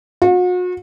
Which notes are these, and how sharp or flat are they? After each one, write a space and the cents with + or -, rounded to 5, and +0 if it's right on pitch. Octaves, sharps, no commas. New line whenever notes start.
F#4 -40